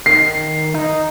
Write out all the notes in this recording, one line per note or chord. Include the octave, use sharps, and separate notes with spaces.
D#3 C7
D#4